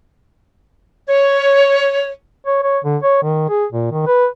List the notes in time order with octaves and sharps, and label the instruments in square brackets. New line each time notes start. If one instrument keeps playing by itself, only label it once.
[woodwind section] C#5
[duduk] C#5
C#5
D3
C#5
D#3
G#4
A#2
D#3
B4